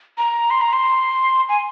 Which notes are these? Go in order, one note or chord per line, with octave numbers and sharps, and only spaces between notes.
A#5
C6
A#5
C6
G#5